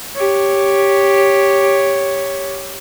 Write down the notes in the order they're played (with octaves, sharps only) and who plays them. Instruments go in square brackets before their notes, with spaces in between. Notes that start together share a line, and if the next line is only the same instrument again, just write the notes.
[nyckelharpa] G4 C#5